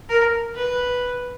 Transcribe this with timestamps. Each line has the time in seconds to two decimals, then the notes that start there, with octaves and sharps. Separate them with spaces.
0.09 A#4
0.55 B4